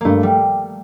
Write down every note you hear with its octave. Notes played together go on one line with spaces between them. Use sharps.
G2 A3 A#3
G3